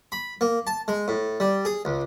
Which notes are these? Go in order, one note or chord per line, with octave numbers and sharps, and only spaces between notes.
B5
A#3
A5
G#3
A2
G3
G#4
C#2